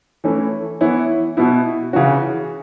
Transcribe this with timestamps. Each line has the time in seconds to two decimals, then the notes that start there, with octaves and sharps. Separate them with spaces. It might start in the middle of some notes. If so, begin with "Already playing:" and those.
0.24 E3 A3 C#4 E4
0.81 E3 B3 E4 C#5
1.37 B2 B3 E4
1.93 C#3 E3 C#4 F#4